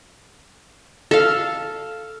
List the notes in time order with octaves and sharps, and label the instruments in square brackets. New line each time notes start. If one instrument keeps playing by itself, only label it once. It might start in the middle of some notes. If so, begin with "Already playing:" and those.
[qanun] A4 F5